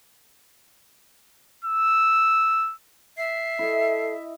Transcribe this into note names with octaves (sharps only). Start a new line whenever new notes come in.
E6
E5 C7
E4 A4 D#5